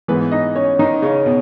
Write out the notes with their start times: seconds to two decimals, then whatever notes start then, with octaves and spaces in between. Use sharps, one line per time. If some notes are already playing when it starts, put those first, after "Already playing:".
0.08 G#2 E3 B3 B4
0.32 D#4 D#5
0.55 C#4 C#5
0.79 D#3 D#4
1.02 C#3 C#4
1.26 B2